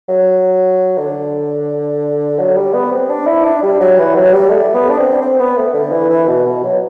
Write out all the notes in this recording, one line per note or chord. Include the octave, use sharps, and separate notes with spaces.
F#3
D3
F#3
G3
B3
C4
D4
E4
D4
G3
F#3
E3
F#3
G3
A3
B3
D4
C4
C4
B3
A3
D3
E3
E3
B2
B2
F#3